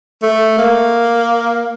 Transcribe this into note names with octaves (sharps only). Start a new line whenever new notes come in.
A3
A#3